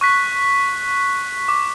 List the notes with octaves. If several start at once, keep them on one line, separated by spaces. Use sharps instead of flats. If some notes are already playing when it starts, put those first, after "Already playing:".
C#6 F#6 B6
D6